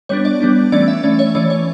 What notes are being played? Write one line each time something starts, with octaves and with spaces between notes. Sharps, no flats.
G3 B3 D4 C#5
D5
G3 B3 D4
E3 A3 C#4 D5
E5
E3 A3 C#4 D5
C#5
E3 A3 C#4 D5
C#5